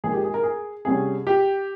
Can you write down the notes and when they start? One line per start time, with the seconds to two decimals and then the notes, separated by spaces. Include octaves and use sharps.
0.04 D#2 D#3 G#3 G#4
0.13 G4
0.24 G#4
0.34 A#4
0.44 G#4
0.85 C2 C3 G3 C#4 G#4
1.27 G4